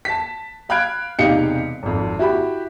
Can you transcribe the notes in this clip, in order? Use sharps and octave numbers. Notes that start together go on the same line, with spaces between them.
A5 B6
F5 B5 F6 F#6 G#6 D7
E1 C3 D#4 G4 F5 C#7
G#1 F2
E4 F#4 G4 B5